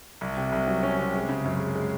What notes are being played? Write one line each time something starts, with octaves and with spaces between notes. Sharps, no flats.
C2
C3
C2
F#3
C#4
C3
G#3
C#3
F#2
G#3
G#3